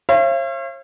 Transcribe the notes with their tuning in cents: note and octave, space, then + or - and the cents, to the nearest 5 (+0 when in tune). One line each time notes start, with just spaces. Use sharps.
C#5 -45 F5 -45